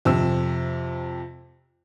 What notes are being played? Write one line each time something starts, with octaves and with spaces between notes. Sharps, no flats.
F2 C3 E6